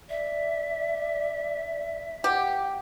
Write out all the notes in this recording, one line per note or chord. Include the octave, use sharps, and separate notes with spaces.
D5 E5
G4 F#5